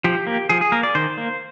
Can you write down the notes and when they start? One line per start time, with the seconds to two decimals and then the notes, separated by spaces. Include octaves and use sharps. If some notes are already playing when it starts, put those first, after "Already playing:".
0.04 F3 G4
0.27 A#3
0.49 F3 G#4
0.61 G#4
0.72 A#3 A#4
0.83 D5
0.95 D#3 C5
1.18 A#3